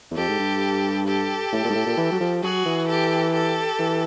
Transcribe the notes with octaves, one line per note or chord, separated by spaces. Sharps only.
E2
F2 G4 A4
G#2
G2
G4 A4
A2
A#2
G#2
A2
A#2
E3
F#3
F3
F#3 F#4 G#4
E3
G4 A4
G4 A4
E3